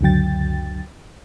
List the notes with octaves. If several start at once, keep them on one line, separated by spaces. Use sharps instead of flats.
C#2 F#2 D3 F#3 G5 A6